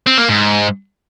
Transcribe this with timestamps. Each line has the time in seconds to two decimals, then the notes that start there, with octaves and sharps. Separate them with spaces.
0.07 C4
0.18 A#3
0.29 G#2